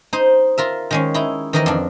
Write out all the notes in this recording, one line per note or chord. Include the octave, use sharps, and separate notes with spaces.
D#4 C5
F4 A#4 E5
D#3 G#3 C#4
D#4 E4
D#3 E3 D#4 A#4 D#5
F2 D4